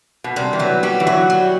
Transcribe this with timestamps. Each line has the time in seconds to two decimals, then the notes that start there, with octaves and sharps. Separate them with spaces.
0.24 B2
0.36 C3 G3
0.53 E3
0.59 F#3 B3
0.83 G3 F#4
1.00 E3
1.07 F#3 F#4
1.30 G3